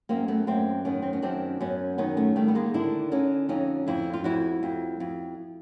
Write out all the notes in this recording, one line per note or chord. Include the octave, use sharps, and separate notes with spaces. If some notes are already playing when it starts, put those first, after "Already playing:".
F#2 A#3 C4
A3 B3
F#2 A#3 C4
D#3 B3 C#4
C4
C#4
F#2 C4 D4
F#2 B3 C#4
D#3 B3 C#4
A3 B3
D#3 G3 A3
B3
G#3 A#3
D3 D4 E4
D3 C#4 D#4
F2 C#4 D#4
F2 D4 E4
F4
F2 E4 F#4
F2
F2